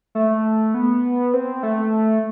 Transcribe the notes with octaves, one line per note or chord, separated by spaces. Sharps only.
A3
B3
C4
A3